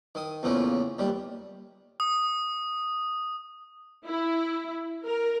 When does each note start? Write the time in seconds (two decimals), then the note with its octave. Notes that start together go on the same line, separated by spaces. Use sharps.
0.15 D#3 D#6
0.43 E2 A2 C#3 F3 A#3
0.99 D#2 G3
2.00 D#6
4.07 E4
5.04 A#4